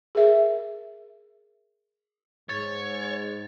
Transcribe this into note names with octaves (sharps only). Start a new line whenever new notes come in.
G#4 A#4 E5
G#2 C#5 A6